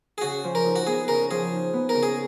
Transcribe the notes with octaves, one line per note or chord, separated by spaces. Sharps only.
G#4
C#3 F#4
F3
A#4
D#4
F#4
B3 G#4
C#3 A#4
F3 G#4
D#4
B3
A#4
C#3
G#4